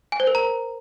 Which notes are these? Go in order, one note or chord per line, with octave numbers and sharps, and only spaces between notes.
G#5
C5
A#4
A#5